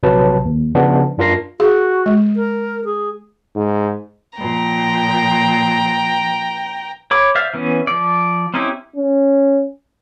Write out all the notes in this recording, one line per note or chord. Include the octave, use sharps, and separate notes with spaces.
A#1 C3 F#3 B4 A5
D#2
C#3 F3 B3 D4
F#2 D4 F4 A#4 A#6 C7
F#4 G#4
G#3
A#4
G#4
G#2
A#2 F3 G5 A#5
C#5 B5 D6
C5 D5 E5 F5
E3 B3 C#4
F3 D5
C4 C#4 D#4 E4 G4
C#4